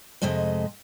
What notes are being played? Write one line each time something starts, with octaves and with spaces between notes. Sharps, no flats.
F2 C3 G#3 A3 D#5